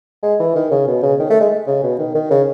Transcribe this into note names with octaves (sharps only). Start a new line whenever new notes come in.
G#3
E3
D#3
C#3
B2
C#3
D#3
A3
G#3
C#3
B2
D#3
D#3
C#3